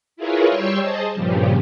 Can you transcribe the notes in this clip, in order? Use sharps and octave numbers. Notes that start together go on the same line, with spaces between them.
E4 F4 G#4 A#4 B4 C#5
G3 C#5 G5 C6 C#6 E6
G#4 C5 D#5 A5
G2 A#2 C#3 F3 G3